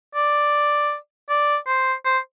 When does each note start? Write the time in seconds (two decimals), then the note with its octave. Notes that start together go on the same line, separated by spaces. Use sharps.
0.15 D5
1.30 D5
1.67 C5
2.05 C5